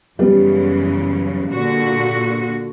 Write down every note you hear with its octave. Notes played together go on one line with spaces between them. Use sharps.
F#2 C#3 E3 G3 B3
A#2 D3 F#4